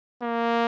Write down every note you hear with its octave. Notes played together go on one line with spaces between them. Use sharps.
A#3